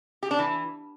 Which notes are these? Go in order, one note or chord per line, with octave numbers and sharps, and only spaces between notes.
G4
D4
E3